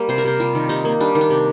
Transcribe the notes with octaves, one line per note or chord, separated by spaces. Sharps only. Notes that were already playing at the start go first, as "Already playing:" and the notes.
Already playing: G3 A#3
C3 C5
A#4
C3 C5
G3 F4
D#3
C3 D#4
A#3
G3 D4
D#3
D4
C3